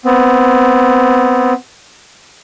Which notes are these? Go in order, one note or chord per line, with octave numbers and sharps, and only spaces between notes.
B3 C4